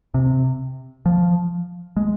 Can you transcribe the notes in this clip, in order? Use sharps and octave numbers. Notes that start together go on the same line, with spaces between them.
C3
F3
G#3